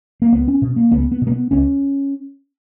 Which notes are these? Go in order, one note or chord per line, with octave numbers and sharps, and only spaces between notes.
A#3
C#2 B3
C#4
B2
A#3
C#2 B3
B3
B2
A#3
B3
C#2 C#4